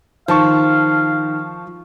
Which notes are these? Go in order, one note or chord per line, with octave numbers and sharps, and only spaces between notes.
D#3 F3 C5 F5 A5 C#6